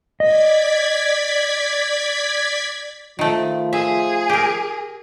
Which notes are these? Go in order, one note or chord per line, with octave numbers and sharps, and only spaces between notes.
D5 D#5 G#6 B6
D#3 F3 A3
G#4 E5
G4 A#4